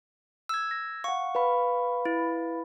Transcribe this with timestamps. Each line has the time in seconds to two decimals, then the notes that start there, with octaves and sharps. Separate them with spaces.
0.49 E6 G#6
0.71 A#6
1.04 F5 F#5 C#6
1.35 B4 F5 B5
2.05 E4